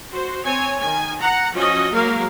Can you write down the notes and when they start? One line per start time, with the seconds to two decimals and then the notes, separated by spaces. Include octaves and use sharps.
0.10 F#4 C5
0.44 C4 C#5 G#5
0.80 D#3 G#5
1.18 F#5 A#5
1.53 F3 C#4 F#4 D#5
1.93 F#3 G#3 A#3 A#4 F5